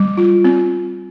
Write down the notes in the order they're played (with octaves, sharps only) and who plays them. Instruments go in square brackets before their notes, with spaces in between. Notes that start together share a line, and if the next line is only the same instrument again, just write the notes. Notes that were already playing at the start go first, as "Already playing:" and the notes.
Already playing: [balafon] G3
F4
C4